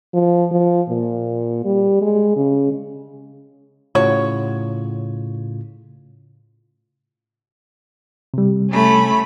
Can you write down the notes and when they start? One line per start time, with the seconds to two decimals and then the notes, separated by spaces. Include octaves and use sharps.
0.14 F3
0.51 F3
0.89 A#2
1.65 G3
2.01 G#3
2.36 C#3
3.95 A2 C#3 F4 F#4 C#5
8.34 C3 G3
8.71 A3 C#4 B5